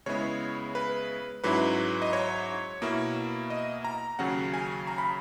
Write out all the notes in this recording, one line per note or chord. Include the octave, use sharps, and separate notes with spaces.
C#3 G#3 B3 E4 C#5
B4
G#2 F#3 C#4 E4 B4
D#5
C#5
B2 A#3 E4
D#5
A#5
D#2 C#3 F#3 C#4 F#5
G#5
A#5
B5